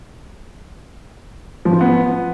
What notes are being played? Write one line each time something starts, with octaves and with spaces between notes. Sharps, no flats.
F3
F4
B3